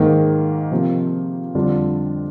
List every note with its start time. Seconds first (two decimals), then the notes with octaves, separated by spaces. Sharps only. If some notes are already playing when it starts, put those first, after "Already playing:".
Already playing: G#2 D#3 A#3
0.72 C3 F3 A#3
1.55 F2 D3 G3 D4 F4